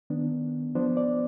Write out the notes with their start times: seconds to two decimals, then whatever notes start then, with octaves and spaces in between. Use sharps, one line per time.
0.10 D#3 B3 D4
0.75 F3 B3 D4 C5
0.97 D5